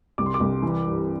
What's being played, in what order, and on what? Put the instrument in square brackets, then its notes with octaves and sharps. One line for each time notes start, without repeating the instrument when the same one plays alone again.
[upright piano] C2 D6
C6
D6
C2
E3
G2